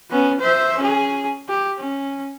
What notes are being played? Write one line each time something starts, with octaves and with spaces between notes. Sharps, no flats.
B3 C#4
C5 E5
C#4 G#4
G4
C#4